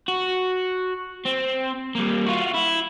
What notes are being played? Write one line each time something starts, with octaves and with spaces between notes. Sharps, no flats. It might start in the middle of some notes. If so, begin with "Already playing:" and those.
F#4
C4
G3 A#3
F4 F#4
E4